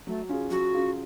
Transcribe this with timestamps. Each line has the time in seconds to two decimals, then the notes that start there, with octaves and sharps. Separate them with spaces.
0.07 F#3 A3
0.29 C#4 F4 G#4
0.51 F#3 F#4
0.72 C#4 F4 G#4